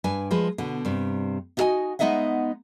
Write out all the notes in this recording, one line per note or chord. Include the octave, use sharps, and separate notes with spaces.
G2 D4 B4 G#5
F3 G#3 B4
B2 D3
G2 C3
D#4 F4 F#4 A4 D#5 G#5
G#3 B3 D#4 D#5 E5 F#5